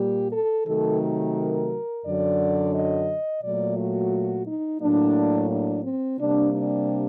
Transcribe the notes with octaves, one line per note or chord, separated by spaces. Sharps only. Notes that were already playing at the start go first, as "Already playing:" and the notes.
Already playing: A#2 G3 A#3 G4
A4
C3 D#3 F#3 A3 A4
A#4
F#2 D3 F#3 D5
D#5
A#2 F#3 A3 D5
F#4
D#4
A2 F#3 A#3 D4
D4
C4
C3 G3 A#3 D4
D4